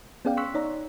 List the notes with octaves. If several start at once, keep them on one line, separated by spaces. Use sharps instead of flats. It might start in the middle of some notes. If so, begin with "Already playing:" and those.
B3 C#4 G#4 D5 F5 G5
C6 C#6 E6 F#6 B6
D#4 C#5 D5 A#5